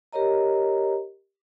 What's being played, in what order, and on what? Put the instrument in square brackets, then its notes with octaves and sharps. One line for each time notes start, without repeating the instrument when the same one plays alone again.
[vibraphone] G4 A#4 C#5 D#5 A#5